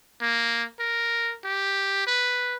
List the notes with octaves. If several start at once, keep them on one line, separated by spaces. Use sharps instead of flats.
A#3
A#4
G4
B4